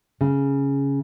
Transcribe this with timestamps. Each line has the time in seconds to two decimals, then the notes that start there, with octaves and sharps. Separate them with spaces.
0.21 C#3